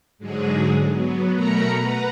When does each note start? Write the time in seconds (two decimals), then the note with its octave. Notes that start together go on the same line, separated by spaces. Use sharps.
0.18 G#2 D3 F#3 G#3 G#4
0.89 F#3 B3
1.32 B2 A3 A#4 A#5 B5 C#7
1.73 B4 F#5 A#5